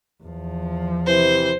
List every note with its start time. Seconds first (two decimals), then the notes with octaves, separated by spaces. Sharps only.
0.24 E2 F3
1.06 C3 E3 C5